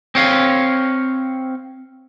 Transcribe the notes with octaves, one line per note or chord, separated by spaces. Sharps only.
C4 C#5 F5